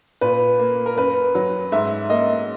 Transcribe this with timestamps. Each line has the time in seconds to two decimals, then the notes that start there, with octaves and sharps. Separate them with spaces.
0.21 A#2 B4
0.59 A#3
0.86 A#4
0.96 F#2 B4
1.35 F#3
1.72 G#2 E5
2.10 A#3 D#5